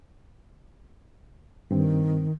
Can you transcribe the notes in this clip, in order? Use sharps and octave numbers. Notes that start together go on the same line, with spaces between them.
G2 D#3 C4